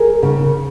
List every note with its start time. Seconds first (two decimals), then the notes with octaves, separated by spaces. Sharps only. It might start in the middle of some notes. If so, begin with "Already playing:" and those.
Already playing: G#4 A#4
0.23 C#3